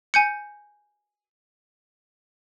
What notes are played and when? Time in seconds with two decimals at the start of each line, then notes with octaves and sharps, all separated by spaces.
0.14 G#5 G6 C#7